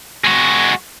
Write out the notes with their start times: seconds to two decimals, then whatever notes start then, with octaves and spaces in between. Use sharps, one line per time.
0.24 G#3 F#4